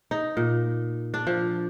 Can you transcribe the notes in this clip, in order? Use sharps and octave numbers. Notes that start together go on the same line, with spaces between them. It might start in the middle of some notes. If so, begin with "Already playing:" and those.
D#4
A#2
D4
F3